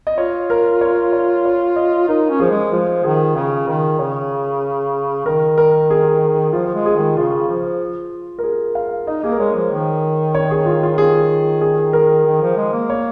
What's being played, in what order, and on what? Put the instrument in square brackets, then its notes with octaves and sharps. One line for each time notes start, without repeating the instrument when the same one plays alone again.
[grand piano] D#5
[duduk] F4 [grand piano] C#5
[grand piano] A#4
C#5
C#5
C#5
D#5
[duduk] D#4 [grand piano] A#4
[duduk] C#4
[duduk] F3 [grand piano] G#4
[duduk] G#3
[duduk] F3 [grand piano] F4
[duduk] D#3 [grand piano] G#4
[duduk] C#3 [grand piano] G#4
[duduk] D#3 [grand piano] A#4
[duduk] C#3 [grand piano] C#5
[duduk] D#3 [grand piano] A#4
[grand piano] A#4
G#4
[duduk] F3 [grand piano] F4
[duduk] F3
G#3
[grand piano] G#4
[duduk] D#3
[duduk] C#3 [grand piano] F4
[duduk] F3
[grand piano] A#4
G#4
F5
[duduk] D#4 [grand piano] D#5
[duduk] A#3 [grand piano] G#4
[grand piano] A#4
[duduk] G#3 [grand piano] C#5
[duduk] F3
D#3
[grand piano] C#5
G#4
F4
F4
[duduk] D#3 [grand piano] G#4
[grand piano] G#4
A#4
[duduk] D#3
F3
G#3
A#3
[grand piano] C#5